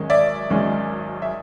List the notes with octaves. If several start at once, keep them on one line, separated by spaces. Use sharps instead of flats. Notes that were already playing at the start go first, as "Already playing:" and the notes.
Already playing: G#1 F#2 D#3 G#3 C#4
D5 E5
G#1 F#2 D#3 G#3 C#4
E5